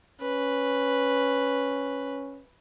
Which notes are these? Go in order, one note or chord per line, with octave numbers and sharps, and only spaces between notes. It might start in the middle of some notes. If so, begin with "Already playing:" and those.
C#4 B4